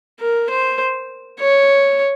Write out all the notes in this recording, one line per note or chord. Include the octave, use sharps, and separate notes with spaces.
A#4
C5
C#5